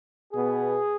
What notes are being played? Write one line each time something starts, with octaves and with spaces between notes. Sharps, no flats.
B2 B3 G#4